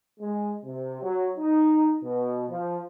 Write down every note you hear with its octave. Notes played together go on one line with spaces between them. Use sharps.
G#3
C3
F#3
D#4
B2
F3